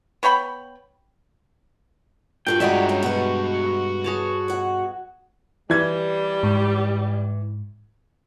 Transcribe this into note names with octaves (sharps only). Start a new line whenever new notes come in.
B3 C#5 G5 B5
G2 F4 F#4 A4 A#4 G5
F#3 G#3 F4 F#4 D5 E5 F#5
C#4
B2 B4
G#4 C#5 A5
B2 F#5
E3 G3 G#6
G#2